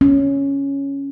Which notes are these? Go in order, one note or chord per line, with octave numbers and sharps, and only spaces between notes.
C#4